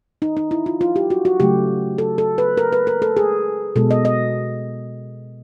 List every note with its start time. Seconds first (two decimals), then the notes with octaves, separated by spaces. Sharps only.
0.22 D#4
0.37 D#4
0.51 E4
0.66 F4
0.81 F4
0.96 G4
1.10 F#4
1.25 F#4
1.40 C#3 F#3 A3 G4
1.98 A4
2.18 A4
2.38 B4
2.57 A#4
2.73 B4
2.87 A#4
3.02 A4
3.17 G#4
3.76 B2 G#3 A4
3.91 D#5
4.05 D#5